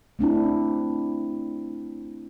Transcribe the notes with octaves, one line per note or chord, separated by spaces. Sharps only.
A3 C4 D4 E4